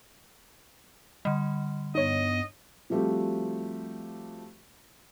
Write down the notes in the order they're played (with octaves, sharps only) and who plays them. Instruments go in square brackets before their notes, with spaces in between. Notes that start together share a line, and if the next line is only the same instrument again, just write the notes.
[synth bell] D3 G3 [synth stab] D#5
[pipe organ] G2 B3 [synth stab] D#4 C#5 [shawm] D#5
[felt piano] F3 G3 A3 C4 F#4 G4